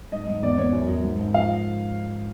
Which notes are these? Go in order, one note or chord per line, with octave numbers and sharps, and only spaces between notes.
G#2 D#5
G#2
E2 D5
E2 C#5
F#2
F#2
G#2
G#2
F3 F5